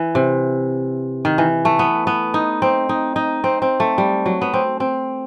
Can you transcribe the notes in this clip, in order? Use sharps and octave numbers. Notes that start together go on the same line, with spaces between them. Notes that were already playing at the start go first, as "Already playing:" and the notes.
Already playing: E3
C3
D#3
E3
A3
B3
B3
D#4
C4
D#4
D#4
C4
C4
A3
G3
F#3
B3
C4
C4